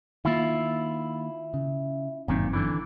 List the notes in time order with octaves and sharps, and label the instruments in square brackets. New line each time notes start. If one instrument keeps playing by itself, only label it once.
[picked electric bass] D#3 A#3 [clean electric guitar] E4 F4
[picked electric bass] C#3
[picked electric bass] G1 F#2 C4 [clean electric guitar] A#2 D#3
[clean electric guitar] D3 E3